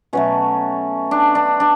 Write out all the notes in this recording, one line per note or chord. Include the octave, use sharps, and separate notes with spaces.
B2 F#3 A3 C#4
D4
D4
D4